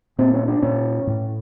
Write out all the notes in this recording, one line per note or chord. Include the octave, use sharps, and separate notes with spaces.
A#2 C4
C#4
D4
A#2 C#4
A2